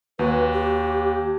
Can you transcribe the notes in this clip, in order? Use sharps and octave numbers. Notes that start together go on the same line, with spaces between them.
D#2 F#4 B4
G4